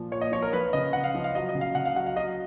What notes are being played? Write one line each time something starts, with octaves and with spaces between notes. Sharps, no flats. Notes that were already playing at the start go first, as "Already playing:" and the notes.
Already playing: A#2 F3
A#2 C#5
D#5
F3 C#5
A#4
F3 B4
C#3 D#5
C#3 F#5
F5
F3
F5
F#3 D#5
D#5
C#3
F5
C#3 F#5
F5
F#3 F#5
F5
F#3 D#5